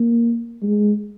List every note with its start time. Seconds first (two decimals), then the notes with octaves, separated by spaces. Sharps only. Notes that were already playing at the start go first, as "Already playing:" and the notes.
Already playing: A#3
0.63 G#3